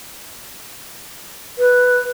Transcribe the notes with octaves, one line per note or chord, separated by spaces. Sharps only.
B4